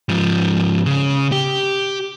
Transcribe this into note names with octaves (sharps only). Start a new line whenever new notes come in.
G#2 F3
C#3
G4